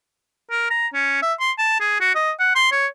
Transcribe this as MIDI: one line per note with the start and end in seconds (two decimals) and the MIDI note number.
0.50 0.70 70
0.70 0.87 82
0.94 1.22 61
1.23 1.33 76
1.40 1.51 84
1.58 1.80 81
1.80 1.99 68
2.01 2.12 66
2.15 2.32 75
2.40 2.55 78
2.55 2.71 84
2.72 2.87 73